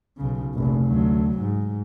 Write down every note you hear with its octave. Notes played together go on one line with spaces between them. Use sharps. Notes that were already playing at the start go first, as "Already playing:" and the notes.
B1 C#3
F1 A#1
D2 F#3
G#2